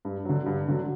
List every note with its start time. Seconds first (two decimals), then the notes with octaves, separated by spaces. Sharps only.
0.05 G2
0.25 D3 F#3
0.46 G2
0.68 D3 F#3